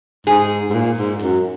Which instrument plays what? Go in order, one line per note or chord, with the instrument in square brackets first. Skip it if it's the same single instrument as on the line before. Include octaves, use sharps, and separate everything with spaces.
[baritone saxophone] G#2 [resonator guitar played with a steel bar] G#4
[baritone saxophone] G#2
A#2
G#2
F#2